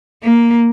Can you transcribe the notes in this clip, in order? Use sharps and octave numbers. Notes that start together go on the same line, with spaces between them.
A#3